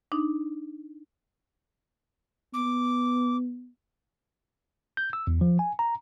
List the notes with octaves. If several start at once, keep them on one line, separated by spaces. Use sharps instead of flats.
D4 D#4
B3 D6
G6
E6
E2
F3
G#5
A#5